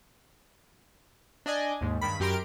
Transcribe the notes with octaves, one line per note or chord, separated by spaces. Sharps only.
D4 D5 D#5 G#5
D#2 G#2
G2 D#3 B5
F#2 G4 A#4 C6 D7